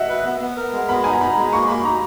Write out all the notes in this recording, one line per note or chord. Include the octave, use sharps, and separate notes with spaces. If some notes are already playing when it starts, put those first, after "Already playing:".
Already playing: D#5 E5 F#5
B4
B3
B3
A#4
G#3
B3 B5
D#4 G#5
A#5
D#4 B5
G#3
A#3 C#6
A#3 B5
D#4 A#5